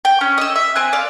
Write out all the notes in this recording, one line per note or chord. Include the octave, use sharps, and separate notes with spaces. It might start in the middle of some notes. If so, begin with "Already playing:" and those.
G5
C#4
D#5 E6
E5
C4 G#5 F#6
D5 F5